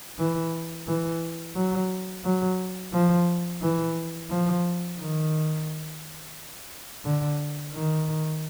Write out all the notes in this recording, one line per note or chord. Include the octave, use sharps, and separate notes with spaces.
E3
E3
F#3
F#3
F3
E3
F3
D#3
D3
D#3